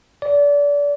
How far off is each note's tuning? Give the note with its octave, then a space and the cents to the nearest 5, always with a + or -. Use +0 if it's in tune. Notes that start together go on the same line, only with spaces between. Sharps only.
D5 -30